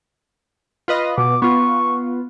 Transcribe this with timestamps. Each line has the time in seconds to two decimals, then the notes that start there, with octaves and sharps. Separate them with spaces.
0.88 F4 B4 D#5
1.18 B2 D6
1.42 B3 F4 C#6